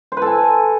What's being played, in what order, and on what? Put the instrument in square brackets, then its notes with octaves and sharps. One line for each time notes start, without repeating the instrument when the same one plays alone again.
[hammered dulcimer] C5
B4
A4
G#5